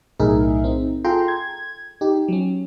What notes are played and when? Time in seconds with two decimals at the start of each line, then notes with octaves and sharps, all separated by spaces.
0.20 B1 A2 D#4 G#4 A#4 E5
0.64 C4 D#4
1.04 F4 G#4 A4 G5 A#5 C6
1.28 G#6
2.01 D#4 G4
2.28 F#3 C#4